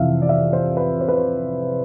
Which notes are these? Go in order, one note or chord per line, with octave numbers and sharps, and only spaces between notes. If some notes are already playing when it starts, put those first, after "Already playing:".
Already playing: F2 C3 E3 E5 F5
D5
E5
C5
B4
C5
B4
C5